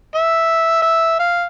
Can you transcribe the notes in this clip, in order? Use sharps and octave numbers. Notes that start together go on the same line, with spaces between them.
E5
E5
F5